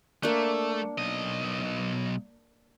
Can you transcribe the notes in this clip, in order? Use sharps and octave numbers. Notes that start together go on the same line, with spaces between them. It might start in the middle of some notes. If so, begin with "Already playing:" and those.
A3 A#3 D4
B1 D#5